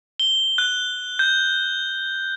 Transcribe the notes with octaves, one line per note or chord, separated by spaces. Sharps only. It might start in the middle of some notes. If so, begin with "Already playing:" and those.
G7
F#6
G6